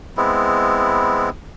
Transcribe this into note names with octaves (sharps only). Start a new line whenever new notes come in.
G#3 B3 C4 E4